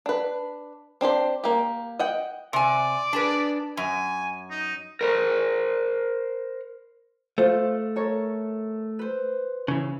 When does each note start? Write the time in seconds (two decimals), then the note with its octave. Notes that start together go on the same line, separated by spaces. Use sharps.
0.06 D4 B4
1.01 C4 D4 G4 C5
1.44 A#3 G4
1.99 D#5 F#5 G5
2.53 C3 D5 G#5
3.13 D4 G#4 B4
3.77 F#2 G#5
4.50 D#4
5.01 A#4 C5
7.38 A3 F4 C5
7.96 A4 A#4 C#5
8.99 B4 C5
9.68 C#3 E3